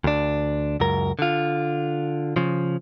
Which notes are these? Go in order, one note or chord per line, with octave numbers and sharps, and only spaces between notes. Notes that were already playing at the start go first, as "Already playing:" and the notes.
D2 D4
C#2 F#2 A#4
D3 F4
C#3 F3